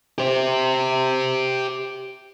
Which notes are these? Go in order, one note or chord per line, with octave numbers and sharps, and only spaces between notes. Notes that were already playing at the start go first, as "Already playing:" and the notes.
G4 C5